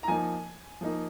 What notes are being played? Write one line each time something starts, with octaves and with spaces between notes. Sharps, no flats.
A#5
F3 A#3 D#4 G#5
F3 A#3 D#4